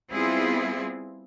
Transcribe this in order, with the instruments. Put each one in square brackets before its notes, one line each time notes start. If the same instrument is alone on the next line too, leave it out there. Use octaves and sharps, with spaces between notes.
[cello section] G3 B3 C4 E4 F4 G#4